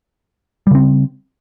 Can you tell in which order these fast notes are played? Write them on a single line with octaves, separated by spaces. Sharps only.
G3 C#3 C4